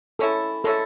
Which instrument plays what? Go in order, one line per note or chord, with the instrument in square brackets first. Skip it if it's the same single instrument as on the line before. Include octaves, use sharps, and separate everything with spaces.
[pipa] G#3 C#4 E4 [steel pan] A4
[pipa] G#3 C#4 E4 [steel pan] A4